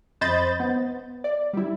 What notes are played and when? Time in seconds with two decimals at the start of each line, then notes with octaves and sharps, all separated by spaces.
0.21 F2 C5 D#5 B5 G6 A6
0.60 B3
1.24 D5
1.53 G3 E4